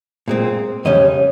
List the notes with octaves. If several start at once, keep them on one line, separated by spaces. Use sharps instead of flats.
A#2 G#3 C4
F2 C#3 G3 C#4 D#5